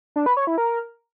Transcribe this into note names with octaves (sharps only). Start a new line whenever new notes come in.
D4
B4
C#5
E4
A#4